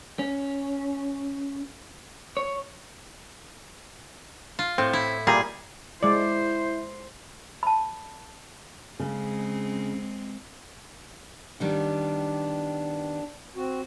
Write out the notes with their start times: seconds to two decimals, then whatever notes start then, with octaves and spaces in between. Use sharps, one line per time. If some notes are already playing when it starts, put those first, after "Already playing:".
0.19 C#4
2.37 C#5
4.59 F4
4.78 A2 C4
4.93 E4
5.27 A#2 G3 G#4 A#5
6.03 G#3 E4 C5 D5
7.63 A5 B5
9.00 C#3 G#3 C4
11.60 D#3 G3 B3 D4
13.56 C4 F#4